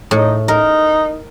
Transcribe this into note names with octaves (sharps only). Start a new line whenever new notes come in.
A2 D#4
D#4 A#4